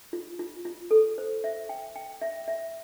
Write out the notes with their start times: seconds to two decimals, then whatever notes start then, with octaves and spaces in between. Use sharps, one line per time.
0.13 F4
0.39 F4
0.65 F4
0.91 A4
1.18 C5
1.44 E5
1.69 G5
1.96 G5
2.22 E5
2.48 E5